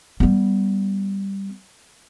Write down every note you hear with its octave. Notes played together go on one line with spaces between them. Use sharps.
G3 B3